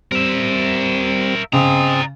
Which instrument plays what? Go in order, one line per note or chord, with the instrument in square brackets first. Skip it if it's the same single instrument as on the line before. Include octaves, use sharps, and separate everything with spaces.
[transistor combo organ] G3 C4 [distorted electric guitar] A#4 E5
[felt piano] C#3 [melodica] C4 G#4 [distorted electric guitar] D5 A#5 [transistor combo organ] D#5